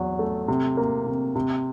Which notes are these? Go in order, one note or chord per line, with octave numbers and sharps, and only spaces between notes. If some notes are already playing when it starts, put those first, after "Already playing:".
Already playing: E2 F#3
A3
C3
A#3
C3
C3